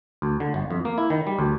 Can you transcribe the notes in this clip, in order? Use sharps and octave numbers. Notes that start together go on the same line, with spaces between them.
D2
D3
G1
F2
A#3
E4
D#3
G3
D2